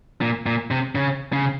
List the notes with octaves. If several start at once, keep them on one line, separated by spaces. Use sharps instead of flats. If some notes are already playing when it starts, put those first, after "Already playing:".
A#2
A#2
C3
C#3
C#3